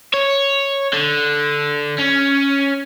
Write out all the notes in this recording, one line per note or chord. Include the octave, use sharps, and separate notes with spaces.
C#5
D3
C#4